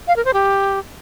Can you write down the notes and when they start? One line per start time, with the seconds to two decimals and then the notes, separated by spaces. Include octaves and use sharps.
0.08 F5
0.16 A#4
0.25 C5
0.34 G4